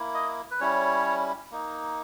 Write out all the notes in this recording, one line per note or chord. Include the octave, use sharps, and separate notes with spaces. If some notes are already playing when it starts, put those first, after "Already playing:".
Already playing: A#3 E4
D#5
B4
G3 C#4 E4 C#5
A#3 D#4